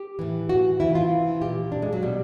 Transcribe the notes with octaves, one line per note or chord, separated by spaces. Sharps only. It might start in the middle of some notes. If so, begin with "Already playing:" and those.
Already playing: G4
A2 E3
F#4
C3 E3 E4
F4
A#2 G4
D4
G#3
F#3
B2 G3